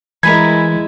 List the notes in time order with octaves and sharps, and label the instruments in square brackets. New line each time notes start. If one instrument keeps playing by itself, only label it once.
[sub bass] E3 [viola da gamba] G#3 E4 [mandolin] A#4 G#5 B5 [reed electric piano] G#6